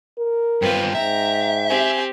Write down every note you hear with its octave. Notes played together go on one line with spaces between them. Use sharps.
A#4
G2 C4 F4 B4 G5
G#2 E5 A#5
C4 G4 G#5